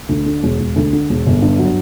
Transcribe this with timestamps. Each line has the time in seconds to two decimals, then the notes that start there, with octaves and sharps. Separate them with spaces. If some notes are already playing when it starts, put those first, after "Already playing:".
0.09 D2
0.26 D3
0.43 E1
0.59 E1
0.76 D2
0.93 D3
1.10 E1
1.26 G1
1.42 G2
1.59 F#3